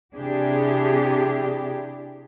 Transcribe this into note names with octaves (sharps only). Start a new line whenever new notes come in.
C3 D4 E4 G4 G#4